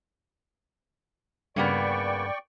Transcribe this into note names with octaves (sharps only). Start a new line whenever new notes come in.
G2 C#3 A#3 B3 D5 G5 C#6